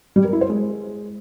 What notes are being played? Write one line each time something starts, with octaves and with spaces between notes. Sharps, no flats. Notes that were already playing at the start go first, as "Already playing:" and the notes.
G3
A#4
E4
C5
G#3